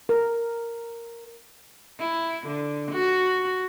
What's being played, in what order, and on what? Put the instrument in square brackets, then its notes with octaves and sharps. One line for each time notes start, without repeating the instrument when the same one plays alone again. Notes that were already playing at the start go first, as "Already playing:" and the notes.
[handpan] A#4
[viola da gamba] E4
D3
F#4